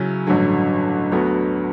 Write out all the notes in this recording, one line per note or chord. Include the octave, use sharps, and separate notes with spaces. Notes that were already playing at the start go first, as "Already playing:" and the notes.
Already playing: C#3 F#3 C#4 E4
A1 G2 D3 F#3
D2 D3 F#3 B3 F#4